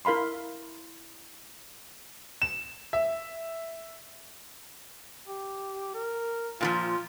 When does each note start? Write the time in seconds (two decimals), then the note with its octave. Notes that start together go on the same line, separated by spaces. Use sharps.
0.05 E4 A#4 F5 B5 C6
2.42 E7
2.93 E5
5.27 G4
5.94 A#4
6.61 A#2 D#3 F3 F4